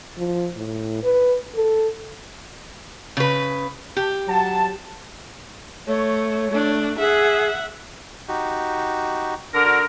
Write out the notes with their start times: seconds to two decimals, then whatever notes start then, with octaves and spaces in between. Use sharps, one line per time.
0.18 F3
0.57 A2
1.03 B4
1.55 A4
3.17 C#3 B4
3.97 G4
4.28 F#3 A5
5.87 A3 C#5
6.51 A3 D4
6.98 G#4 E5 F#5
8.28 D#4 F#4 G4
9.53 D3 A#4
9.65 F#4 D5